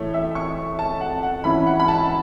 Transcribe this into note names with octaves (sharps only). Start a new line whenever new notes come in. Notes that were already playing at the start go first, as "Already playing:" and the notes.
Already playing: A2 E3 A3 E4 C#5
E5
C#6
A5
F#5
F#5
E3 C#4 E4 B5
F#5
B5
A5